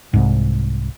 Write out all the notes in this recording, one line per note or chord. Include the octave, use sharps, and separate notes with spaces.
C2 G#2